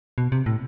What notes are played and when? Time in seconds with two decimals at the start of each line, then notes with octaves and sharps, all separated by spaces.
0.18 B2
0.32 C3
0.46 A2